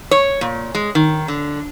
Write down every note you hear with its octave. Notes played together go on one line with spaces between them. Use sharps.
C#5
A#2
G#3
D#3
D3